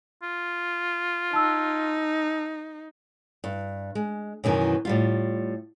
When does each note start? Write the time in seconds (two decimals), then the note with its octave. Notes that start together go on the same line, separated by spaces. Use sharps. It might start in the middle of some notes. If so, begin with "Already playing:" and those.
0.23 F4
1.33 D#4 A5 E6
3.44 G2
3.95 G#3
4.44 F#2 B2 D#3 E3
4.85 A2 G3 F4